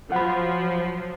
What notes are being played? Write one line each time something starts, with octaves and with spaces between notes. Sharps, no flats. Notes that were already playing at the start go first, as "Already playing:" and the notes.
F3 F#3 F#5 B5